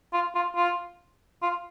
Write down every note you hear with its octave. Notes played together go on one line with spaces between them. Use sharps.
F4
F4
F4
F4